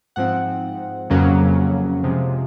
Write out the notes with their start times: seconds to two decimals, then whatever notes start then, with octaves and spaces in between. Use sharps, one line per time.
0.16 G#2 F3 C4 F#5
1.10 F2 C#3 F#3 A#3 C#4
2.04 C3 F3 G#3